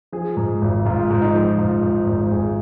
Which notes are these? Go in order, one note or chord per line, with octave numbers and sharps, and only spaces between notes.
F3 G#4
G#2
G#1
G#2 F4
G#2
D#4
F3
G#2 F4
G#2
G#1
G#1 G#4